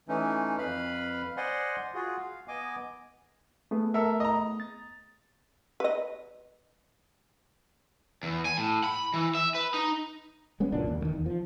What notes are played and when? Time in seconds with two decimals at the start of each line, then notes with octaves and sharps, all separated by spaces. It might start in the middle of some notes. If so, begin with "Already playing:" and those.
0.08 E3 A3 C#4 D#4
0.58 F2 B4 F5 B5 F6
1.37 C5 D5 D#5 F#5 G#5 C6
1.95 F4 F#4 G#4
2.19 F5
2.48 B3 D#5 G#5 D6
3.71 A3 B3 G#4
3.94 A4 A#4 E5
4.20 D#5 A#5
4.60 A6
5.80 B4 D#5
8.23 E2
8.45 G#5
8.57 A2
8.84 B5
9.14 E3
9.35 E5
9.55 B4
9.74 D#4
10.60 G#3 B3 C#4
10.72 C#2 F#2 A#2 D4
10.88 D#2
11.01 D2 D#3
11.13 E2
11.26 F3